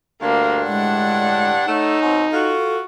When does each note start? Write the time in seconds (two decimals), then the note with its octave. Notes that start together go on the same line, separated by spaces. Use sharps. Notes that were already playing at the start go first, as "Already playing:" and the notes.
0.22 D2 G2 D3 A#3 D4
0.67 A2 G#3 F#5
1.67 A3 D#4 C#5
2.01 B2 D#3 C4
2.32 F4 F#4 A4